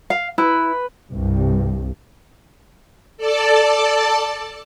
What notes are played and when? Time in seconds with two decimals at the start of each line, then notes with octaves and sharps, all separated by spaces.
0.10 F5
0.38 E4 B4
1.10 C2 G2
3.17 A4 D5 A5